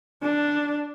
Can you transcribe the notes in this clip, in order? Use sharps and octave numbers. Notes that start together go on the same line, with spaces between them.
D4